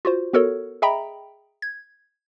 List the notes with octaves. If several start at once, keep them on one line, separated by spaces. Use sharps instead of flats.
F4 F#4 C5
B3 F#4 A4 A#4 C#5
G#4 D#5 E5 G5 A#5 B5
G#6